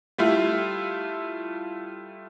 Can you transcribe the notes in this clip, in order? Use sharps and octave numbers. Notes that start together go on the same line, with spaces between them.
G3 A3 E4 F4